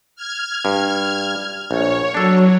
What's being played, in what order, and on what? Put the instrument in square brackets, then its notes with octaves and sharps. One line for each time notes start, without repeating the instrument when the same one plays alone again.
[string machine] F6 G#6
[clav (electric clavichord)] G2
[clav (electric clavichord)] A#1 [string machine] C#5
[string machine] F#3 [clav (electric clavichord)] D4 A4